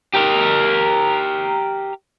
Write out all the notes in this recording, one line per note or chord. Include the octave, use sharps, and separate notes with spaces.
G4 A#4